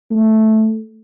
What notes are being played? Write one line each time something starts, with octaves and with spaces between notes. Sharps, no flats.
A3